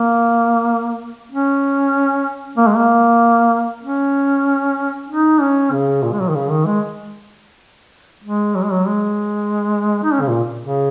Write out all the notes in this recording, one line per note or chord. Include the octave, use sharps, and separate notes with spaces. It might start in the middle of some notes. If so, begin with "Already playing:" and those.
Already playing: A#3
C#4
A#3
G#3
A#3
C#4
D#4
C#4
C#3
A#2
G#3
F#3
D#3
C#3
D#3
G#3
G#3
F#3
G#3
F#3
G#3
D#4
C#4
C#3
A#2
C#3